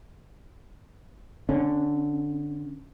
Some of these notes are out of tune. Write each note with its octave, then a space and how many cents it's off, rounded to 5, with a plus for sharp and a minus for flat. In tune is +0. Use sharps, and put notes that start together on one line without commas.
D3 +0 C#4 -15